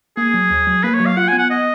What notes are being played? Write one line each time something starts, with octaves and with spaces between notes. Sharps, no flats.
A#3 G#4
F#3
D#2
F#3
A#3 B4
C#5
F#3
F5
F4 F#5
G#5
B3
F#5
D#5